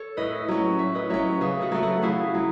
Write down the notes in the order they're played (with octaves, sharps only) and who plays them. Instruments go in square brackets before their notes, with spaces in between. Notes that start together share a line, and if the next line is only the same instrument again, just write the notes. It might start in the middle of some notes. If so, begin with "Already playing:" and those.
Already playing: [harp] A4 C#5
[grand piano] A2 [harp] B4 D#5
[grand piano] F#3 C#4
[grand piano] A2 [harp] C#5 E5
[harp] B4 D#5
[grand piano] F#3 C#4 [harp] C#5 E5
[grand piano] C#3 [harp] G#4 B4
[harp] F#4 A4
[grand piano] F#3 A3
[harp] F#4 A4
[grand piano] C#3 [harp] E4 G#4
[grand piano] F#3